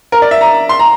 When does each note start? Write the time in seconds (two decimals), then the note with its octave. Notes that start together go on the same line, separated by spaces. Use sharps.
0.12 A#4
0.22 D5
0.31 E5
0.41 A#5
0.69 C6
0.79 A#5